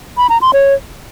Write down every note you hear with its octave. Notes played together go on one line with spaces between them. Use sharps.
B5
A#5
C6
C#5